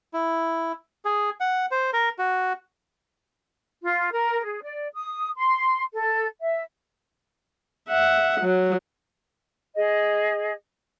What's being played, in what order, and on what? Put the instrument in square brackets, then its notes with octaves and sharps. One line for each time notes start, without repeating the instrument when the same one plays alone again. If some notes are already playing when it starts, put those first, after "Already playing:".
[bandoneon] E4
G#4
F#5
C5
A#4
F#4
[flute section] F4
A#4
G#4
D5
D#6
C6
A4
E5
[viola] E5 F#5
F#3
[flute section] G#4 D#5